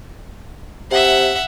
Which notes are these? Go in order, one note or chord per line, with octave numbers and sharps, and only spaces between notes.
C3 E5 F#5